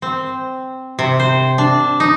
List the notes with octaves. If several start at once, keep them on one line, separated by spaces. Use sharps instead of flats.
C4
C3
C5
D4
D#4